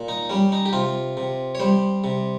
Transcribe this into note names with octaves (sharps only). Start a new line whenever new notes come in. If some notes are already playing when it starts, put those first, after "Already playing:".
Already playing: A#2
D#4
G3 C#4
D#4
G4
C3 F4
C3
C#5
G3 C5
C3